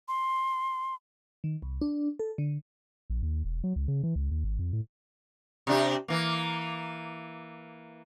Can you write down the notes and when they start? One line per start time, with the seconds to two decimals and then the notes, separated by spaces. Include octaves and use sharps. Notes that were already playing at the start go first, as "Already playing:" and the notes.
0.08 C6
1.44 D#3
1.62 C2
1.81 D4
2.19 A4
2.38 D3
3.10 A#1
3.22 D#2
3.45 E1
3.64 F#3
3.76 C#2
3.88 C#3
4.03 E3
4.15 C#2
4.31 D#2
4.44 G#1
4.59 F2
4.73 A2
5.67 C3 D4 G4
6.08 E3 A#3